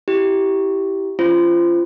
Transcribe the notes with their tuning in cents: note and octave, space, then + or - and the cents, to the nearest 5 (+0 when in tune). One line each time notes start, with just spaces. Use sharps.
E4 +0 G4 -15
C#4 +0 F4 -25 C5 -15